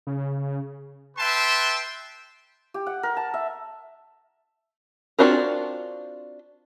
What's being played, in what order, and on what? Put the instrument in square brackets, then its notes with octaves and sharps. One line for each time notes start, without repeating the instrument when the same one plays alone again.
[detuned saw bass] C#3
[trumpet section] B4 E5 G5 A5 C6
[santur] G4
F#5
A#4
A5
E5
[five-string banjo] C4 D4 F4 F#4 A#4